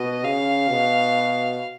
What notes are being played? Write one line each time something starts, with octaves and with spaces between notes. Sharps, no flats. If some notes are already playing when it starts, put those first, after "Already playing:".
Already playing: B2 D#5
C#3 F5
B2